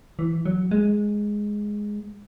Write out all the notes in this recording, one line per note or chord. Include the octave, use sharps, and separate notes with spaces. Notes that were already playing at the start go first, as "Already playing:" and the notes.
E3
F#3
G#3